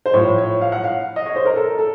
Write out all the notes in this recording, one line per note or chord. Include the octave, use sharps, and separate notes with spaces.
C5
A2 F3 C#5
C#5
F5
F#5
F5
D#5
C#5
C5
A#4
A4
A4